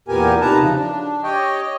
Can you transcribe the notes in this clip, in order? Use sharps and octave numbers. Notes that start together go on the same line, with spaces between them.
E2 A#2 B3 G4 A#4 G#5
C3 D#4 B4 A5 A#5
C#3 F3
D4
G4 C#5 D#5 G5
D#5